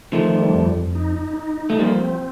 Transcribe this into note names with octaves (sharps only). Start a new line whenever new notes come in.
D#3 F3 A3
G3
F2
F2
D#4
D#4
D#4
D#4
A3
F3 G3 A#3
C4